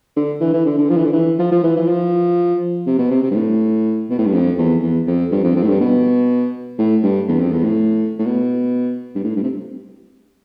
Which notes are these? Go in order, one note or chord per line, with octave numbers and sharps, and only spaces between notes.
D3
E3
E3
D3
D3
F3
E3
D3
E3
F3
F3
E3
E3
F3
C3
B2
C3
C3
G2
A2
B2
A2
G2
F2
E2
E2
F2
G2
F2
F2
A2
G2
B2
A2
G2
E2
F2
E2
A2
A2
B2
G2
A2
G2
C3